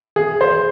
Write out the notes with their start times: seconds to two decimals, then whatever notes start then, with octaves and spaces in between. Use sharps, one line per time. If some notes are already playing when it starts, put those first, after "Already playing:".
0.16 G#4
0.41 C5